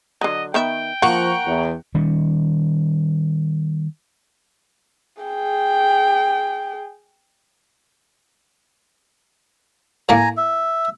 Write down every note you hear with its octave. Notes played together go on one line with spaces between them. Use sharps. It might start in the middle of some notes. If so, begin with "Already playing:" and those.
D3 F#3 D#5
D#3 B3 E5 G5
F3 A#3 F#5 A#5 C#6
E2
D#3 G3 C#4
G#4 G5
A2 A3 A#3 G#5 A#5
E5